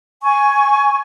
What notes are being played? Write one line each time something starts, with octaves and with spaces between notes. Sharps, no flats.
G#5 C#6